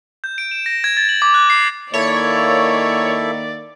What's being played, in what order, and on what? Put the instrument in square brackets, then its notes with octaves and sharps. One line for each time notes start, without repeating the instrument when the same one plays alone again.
[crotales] G6
D7
E7
A#6
G#6
A6
F#7
D6
F#6
C7
[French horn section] D#3 A#3 [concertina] E4 A4 E5 [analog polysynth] C#5 [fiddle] D5